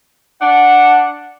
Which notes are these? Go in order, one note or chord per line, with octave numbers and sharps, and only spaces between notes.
D4 F#5